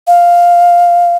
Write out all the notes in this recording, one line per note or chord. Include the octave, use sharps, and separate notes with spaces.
F5